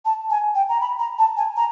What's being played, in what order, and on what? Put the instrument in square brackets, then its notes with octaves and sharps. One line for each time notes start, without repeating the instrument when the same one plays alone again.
[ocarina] A5
G#5
G5
A#5
B5
A#5
A5
G#5
A#5